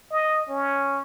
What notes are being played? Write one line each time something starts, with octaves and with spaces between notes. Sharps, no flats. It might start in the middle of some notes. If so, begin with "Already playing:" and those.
D#5
C#4